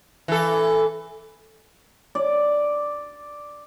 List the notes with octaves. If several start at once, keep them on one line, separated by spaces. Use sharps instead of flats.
E3 A4
D5